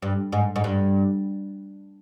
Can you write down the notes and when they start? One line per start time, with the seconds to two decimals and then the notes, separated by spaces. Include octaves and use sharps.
0.02 G2
0.32 G#2
0.56 G#2
0.64 G2